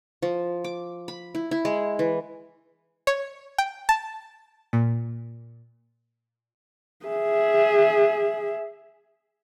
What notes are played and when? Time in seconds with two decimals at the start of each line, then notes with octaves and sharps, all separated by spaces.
0.22 F3
0.64 D6
1.08 B5
1.35 E4
1.51 E4
1.65 G#3
1.99 E3
3.07 C#5
3.58 G5
3.89 A5
4.73 A#2
7.06 G#4 E5